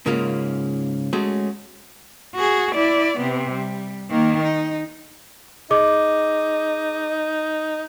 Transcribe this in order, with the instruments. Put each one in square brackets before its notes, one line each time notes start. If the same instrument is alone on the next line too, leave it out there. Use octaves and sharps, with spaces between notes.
[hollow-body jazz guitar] G#2 C#3 G#3 A#3 C#4 F4
G#3 A3 C#4 F#4 G#4
[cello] F#4 G#4
E4 D5
C3 B3
G3
D#3 A#3
D#4
[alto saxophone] D#4 [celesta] G#4 D#5 D6